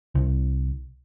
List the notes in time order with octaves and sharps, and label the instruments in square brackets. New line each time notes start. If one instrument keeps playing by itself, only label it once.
[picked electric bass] C2